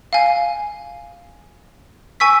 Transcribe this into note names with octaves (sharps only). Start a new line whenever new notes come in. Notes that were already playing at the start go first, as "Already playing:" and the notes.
F5 G#5
G#5 C#6 E6 B6